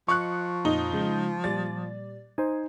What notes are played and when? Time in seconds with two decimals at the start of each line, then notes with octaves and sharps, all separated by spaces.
0.08 F3 D#5 C#6 F#6 C#7
0.65 F2 A#2 D#4
0.93 C#3 G#3 G6
1.44 A#2 G3 D5 A6
2.38 D#4 C5 G#5